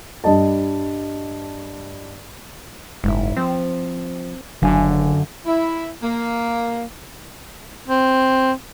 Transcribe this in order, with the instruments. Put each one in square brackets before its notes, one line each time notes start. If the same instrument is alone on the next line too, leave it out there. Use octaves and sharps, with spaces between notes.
[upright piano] G2 D#5 A5
[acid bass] F#1 [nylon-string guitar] G#2 E4
[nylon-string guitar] F3 [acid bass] C4
[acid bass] F#1 [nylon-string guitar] F#2 F5 G#5 [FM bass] D3
[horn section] E4
A#3
[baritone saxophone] C4